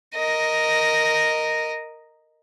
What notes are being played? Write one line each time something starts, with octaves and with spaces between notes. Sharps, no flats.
A#4 D#5